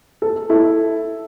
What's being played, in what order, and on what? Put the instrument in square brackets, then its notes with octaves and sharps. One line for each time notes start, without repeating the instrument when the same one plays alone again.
[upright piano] A4
E4 A4